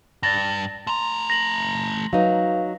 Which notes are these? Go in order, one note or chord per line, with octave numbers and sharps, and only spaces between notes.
G2 D5 A6 A#6
A3 A#5 C6
A#6 F#7
F#3 D#4 B4 F5